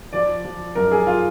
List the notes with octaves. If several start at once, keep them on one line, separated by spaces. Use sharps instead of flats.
F3 D5
F3
F#2 A#4
G#4
F4